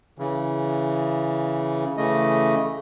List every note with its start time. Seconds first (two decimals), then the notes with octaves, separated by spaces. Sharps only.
0.18 C#3 E3
1.97 C#3 E3 A3 D#5